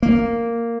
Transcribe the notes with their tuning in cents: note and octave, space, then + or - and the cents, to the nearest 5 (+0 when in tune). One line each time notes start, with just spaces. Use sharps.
A#3 -5